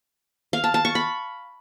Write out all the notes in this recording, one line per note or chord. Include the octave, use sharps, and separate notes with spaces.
F5
A5
A5
C#6
B5